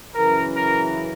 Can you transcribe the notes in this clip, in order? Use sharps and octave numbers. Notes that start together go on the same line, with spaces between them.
F#2 C#3 E3 A#4
A#4